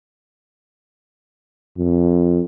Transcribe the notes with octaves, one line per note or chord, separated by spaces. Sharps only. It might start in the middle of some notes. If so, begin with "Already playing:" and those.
F2